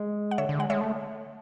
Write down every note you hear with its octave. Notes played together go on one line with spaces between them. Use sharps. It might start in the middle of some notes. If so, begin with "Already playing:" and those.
Already playing: G#3
F#5
D3 C#5 E5
D3
G#3 F#5
G#3 C#5 E5
A3